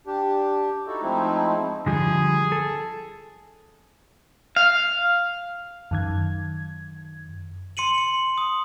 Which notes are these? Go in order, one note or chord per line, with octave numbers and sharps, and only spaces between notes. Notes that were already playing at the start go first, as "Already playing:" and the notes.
D4 G4
D#4 E4 F#4 A4
F3 G#3 A3 C4 D#4 E4
D3 F3 G3 G#4
A4
F5
F#2 D#3 G#6
C6 C#7 D#7 F#7
C#7 F#7
D#6